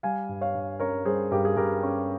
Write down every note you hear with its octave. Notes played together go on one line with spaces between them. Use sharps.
G3 F5 G#5
G2
C#5 F5
G2
C#4 A#4 C#5
G3 G#4 C5
G2 G4 A#4
G#4
G2 G4 A#4
C#4